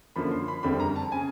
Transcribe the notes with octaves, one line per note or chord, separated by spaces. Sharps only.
F#2 D3 F3 A#3 B5
C6
B5
F#1 F2 D3 G3 C4 B5
A#5
A5
C#3 G#5